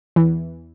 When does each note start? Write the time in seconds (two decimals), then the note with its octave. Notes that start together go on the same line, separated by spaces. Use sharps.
0.16 E2 E3